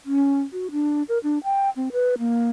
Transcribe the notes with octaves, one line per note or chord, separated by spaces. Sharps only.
C#4
F#4
D4
A#4
D4
G5
C4
B4
A#3